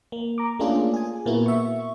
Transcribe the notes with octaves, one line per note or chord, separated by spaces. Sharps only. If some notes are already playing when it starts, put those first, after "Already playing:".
A#3
A#5 D6
A3 A#3 C#4 D4 F4 G#4
G#4 G#5
A#2 A#3 B3 E4 F#4
E5 C#6